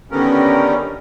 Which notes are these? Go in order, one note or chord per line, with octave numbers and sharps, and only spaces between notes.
D3 D#3 G3 B3 C#4 A#4